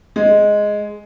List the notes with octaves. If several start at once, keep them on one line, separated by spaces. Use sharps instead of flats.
G#3